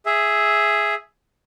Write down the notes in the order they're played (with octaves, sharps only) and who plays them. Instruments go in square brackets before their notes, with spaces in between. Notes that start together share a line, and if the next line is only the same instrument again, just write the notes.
[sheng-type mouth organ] G#4 E5